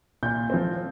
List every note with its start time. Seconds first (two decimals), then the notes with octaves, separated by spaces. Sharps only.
0.23 A#2 G6
0.50 F3 C4